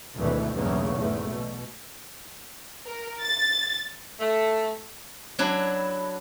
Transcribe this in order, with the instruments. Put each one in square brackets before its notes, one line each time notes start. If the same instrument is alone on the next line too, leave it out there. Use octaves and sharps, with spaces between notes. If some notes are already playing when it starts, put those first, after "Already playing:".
[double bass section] G#1 D2 B2 E3 A3
B1 E2 G2 C#3 A3 A#3
E2 G#2 A3
B2
[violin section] A#4
A6
[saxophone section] A3
[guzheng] F#3 D4 E4